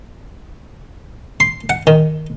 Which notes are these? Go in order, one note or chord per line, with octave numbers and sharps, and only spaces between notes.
C6
F#5
D#3